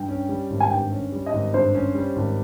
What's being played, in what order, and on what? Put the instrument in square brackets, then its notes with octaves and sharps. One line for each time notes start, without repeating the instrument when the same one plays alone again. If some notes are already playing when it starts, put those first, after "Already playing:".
Already playing: [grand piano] G2 [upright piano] G5
[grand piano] C#4
G3
G#1
[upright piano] G#5
[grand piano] G2 [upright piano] G5
[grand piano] C#4
G3
[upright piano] D#5
[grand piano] G#1
[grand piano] G2 [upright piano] C5
[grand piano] C#4
G3
G#1